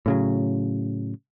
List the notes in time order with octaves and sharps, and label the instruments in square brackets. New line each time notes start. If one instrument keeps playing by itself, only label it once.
[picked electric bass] A2 C#3 F#3